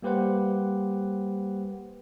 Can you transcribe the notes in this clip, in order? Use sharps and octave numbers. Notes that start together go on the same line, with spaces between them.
G3 A#3 G4 B4 C5 F#5